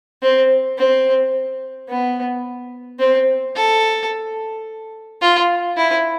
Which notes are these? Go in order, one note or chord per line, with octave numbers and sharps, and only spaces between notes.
C4
C4
B3
C4
A4
F4
E4